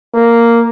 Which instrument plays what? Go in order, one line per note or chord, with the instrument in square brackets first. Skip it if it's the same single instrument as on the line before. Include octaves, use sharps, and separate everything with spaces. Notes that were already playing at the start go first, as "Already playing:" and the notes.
[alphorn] A#3